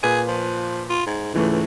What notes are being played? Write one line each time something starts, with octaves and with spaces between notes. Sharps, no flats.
A#2 G#4 B4 D#7
F3
F4
G#2
C#2 G#2 E3 A3